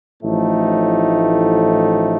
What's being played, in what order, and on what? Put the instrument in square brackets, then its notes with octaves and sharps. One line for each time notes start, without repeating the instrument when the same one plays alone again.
[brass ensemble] A1 A2 F3 A3 D#4